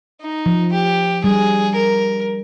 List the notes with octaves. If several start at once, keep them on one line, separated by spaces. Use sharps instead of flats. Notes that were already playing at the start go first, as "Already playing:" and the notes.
D#4
F3
G4
G3 G#4
A#4